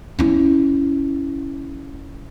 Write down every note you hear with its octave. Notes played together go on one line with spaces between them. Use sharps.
C#4 E4